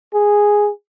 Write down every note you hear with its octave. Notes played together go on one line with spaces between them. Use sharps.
G#4